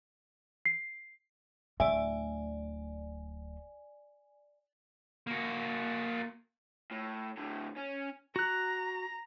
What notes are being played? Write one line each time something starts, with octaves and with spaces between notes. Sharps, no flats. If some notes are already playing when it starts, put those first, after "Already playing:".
C7
D1 A3 D5 E5 G#5
A#3 F#4
A2
A2 D3
C#4
F#4 A#5 F#6